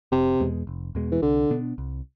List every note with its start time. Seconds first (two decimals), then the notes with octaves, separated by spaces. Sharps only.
0.12 F1 C3
0.40 E2 B2 G#3
0.67 F1
0.95 E2 B2 G#3
1.12 E3
1.22 C2 D3
1.50 B2 B3 D4
1.78 C2